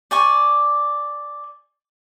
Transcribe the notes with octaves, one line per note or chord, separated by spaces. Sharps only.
D5 G#5 C#6